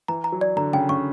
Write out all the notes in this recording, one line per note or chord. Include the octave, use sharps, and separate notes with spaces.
E3 A#5
A#5
F#3
D5
D3 A#5
C#3 G5
C#3 C#6